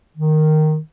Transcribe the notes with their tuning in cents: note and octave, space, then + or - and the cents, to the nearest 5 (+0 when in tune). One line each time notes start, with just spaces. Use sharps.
D#3 -10